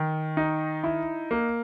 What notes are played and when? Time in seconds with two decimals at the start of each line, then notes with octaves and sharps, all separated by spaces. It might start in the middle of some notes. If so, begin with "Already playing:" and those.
Already playing: D#3
0.37 D#4
0.84 E4
1.31 A#3